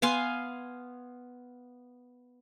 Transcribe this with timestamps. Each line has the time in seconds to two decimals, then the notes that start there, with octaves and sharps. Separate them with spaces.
0.02 B3 F5 G#5 C6